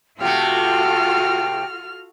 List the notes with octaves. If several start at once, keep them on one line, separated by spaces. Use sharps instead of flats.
C3 A3 F4 F#4 A4 G5 F6